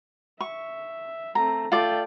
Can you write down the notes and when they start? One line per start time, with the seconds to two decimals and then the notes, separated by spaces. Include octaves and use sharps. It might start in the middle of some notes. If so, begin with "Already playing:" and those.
0.40 E5 C#6
1.35 A3 C4 A#5
1.72 A3 F4 D5 G5